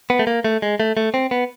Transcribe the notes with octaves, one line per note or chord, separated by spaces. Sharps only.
B3
A3
A#3
A3
G#3
A3
A3
C4
B3